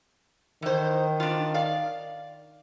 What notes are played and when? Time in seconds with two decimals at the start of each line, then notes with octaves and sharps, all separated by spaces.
0.62 D#3 E3 C5
1.20 D4 F4
1.54 D5 F5